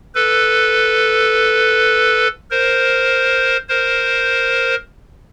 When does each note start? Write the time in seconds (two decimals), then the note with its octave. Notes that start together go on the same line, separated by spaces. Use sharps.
0.15 A4 B4
2.51 A#4 C5
3.69 A#4 C5